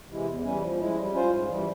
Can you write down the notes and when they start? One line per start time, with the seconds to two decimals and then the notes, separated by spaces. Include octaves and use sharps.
0.09 C3 E3 G#3 E4
0.26 E2
0.44 E3 G3 C#4
0.62 F3
0.79 G#3 E4
0.97 G3
1.14 C#4 F4 C5
1.31 G#2
1.49 E3 G3